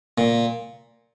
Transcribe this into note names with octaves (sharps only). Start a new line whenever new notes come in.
A#2